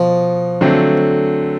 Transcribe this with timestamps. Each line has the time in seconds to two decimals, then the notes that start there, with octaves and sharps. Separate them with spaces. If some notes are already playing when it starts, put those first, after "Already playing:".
Already playing: B2 F3
0.61 D3 F#3 A3 C4